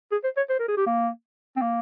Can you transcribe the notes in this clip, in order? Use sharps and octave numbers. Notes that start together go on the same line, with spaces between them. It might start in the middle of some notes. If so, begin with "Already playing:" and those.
G#4
C5
C#5
C5
A#4
G#4
G4
A#3
C4
A#3